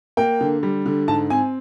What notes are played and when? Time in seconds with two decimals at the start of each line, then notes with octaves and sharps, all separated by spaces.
0.17 A#3 G5
0.41 D3
0.63 G3
0.86 D3
1.08 G#2 A5
1.30 C4 G#5